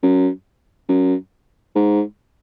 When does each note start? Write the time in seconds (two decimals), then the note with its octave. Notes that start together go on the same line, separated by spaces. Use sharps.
0.03 F#2
0.89 F#2
1.75 G#2